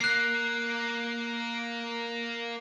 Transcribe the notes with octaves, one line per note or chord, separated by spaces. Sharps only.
A#3 F#6 C7